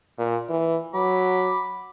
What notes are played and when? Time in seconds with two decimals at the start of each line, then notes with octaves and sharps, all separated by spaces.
0.18 A#2
0.49 E3
0.94 F#3 B5 D6